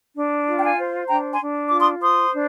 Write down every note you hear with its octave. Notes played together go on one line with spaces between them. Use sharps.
D4
F4
G5
F5 G#5
C5
D4 G5 A#5
G#5 C6
D4
F4 D6
C6 D#6
C5 C6 D#6
D4